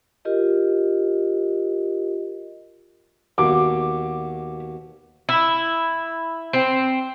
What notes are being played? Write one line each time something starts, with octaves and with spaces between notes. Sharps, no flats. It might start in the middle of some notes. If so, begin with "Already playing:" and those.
F4 G4 A#4 D#5
D#2 B2 D6
E4
C4